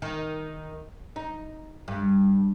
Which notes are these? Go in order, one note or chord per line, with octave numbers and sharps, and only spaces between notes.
D#3
D#4
G2